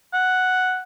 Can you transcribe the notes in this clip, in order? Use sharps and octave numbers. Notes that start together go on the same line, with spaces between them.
F#5